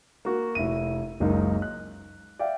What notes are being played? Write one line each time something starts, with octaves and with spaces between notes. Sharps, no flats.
A#3 F#4
F1 E4 D#7
F#1 C#2 F#2 G#3 D#4 A#4
F#6
D5 E5 F5 G5